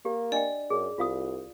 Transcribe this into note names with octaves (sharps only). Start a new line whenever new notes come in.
A#3 G4
D4 D5 D#5 G5
F#2 G#4
C2 F4 F5 D#6